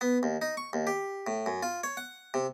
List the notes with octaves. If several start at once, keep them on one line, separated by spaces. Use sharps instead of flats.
B3
D#2
D#4
C#6
D#2
G4
A2
F#2
F4
C#5
F#5
C3